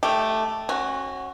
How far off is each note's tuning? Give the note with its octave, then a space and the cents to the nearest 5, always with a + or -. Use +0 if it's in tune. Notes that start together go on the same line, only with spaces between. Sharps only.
A3 +0 G4 +0
C#4 -35 F#4 +5